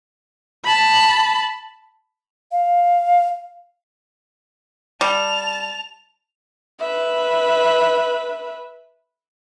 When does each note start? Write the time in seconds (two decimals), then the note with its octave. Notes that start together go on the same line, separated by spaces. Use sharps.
0.65 A5 B5
2.52 F5
5.01 G3 A5 F7
6.80 B4 E5